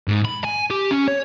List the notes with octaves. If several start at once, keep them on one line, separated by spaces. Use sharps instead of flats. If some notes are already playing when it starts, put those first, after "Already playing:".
G#2
B5
G#5
G4
C#4
C#5